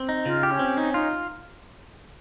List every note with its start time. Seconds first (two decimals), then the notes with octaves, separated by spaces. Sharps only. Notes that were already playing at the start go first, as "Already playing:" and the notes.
Already playing: C4
0.09 D#4
0.25 C#3 F4
0.43 G4
0.51 C#4
0.59 C4
0.77 C#4 D#4
0.94 D#4 F4